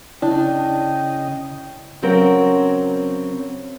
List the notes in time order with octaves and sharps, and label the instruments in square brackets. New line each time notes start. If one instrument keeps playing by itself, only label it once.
[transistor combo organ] C#3 D#5 [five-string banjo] D4 [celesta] E4 [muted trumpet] G5
[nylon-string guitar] C#3 F#3 C4 A#4 C#5